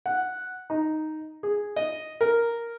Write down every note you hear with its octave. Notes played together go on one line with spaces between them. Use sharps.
F#5
D#4
G#4
D#5
A#4